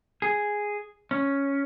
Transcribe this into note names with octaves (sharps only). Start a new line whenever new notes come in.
G#4
C#4